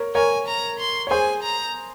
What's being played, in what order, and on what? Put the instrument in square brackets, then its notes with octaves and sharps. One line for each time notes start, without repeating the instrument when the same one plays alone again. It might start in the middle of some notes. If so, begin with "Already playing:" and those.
Already playing: [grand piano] A#4 C#5
[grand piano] A#4 C#5 [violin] G#5
[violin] A#5
C6
[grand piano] C#5
[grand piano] G#4 C5 [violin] G#5
[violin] A#5